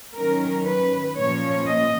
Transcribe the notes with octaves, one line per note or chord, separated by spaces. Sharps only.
D#3 F#3 C#4 A#4
B4
A#2 F3 A#3 C#4 C#5
D#5